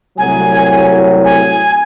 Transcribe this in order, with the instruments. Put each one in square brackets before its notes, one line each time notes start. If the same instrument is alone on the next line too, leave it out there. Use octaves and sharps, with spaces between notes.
[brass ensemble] C2 A2 F#3 [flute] G#5
[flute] G#5